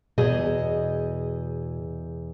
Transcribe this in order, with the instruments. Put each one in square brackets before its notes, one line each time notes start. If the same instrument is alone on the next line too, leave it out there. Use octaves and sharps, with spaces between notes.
[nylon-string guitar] E2 G#4 D#5 [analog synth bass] B2